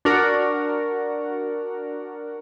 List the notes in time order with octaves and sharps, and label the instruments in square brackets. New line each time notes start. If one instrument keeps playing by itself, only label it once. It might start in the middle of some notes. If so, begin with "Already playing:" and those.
[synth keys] D4 F#4 A#4